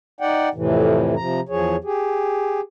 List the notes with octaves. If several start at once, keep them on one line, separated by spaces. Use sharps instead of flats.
D#4 D5 F#5 G5
F2 A2 C3 E3
C3 F3 A#5
E2 F3 G#4 C#5
G4 G#4